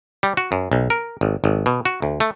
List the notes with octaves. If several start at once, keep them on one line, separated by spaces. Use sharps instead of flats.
G3
F#4
F#2
B1
A#4
G#1
G#1
B2
F#4
D2
A3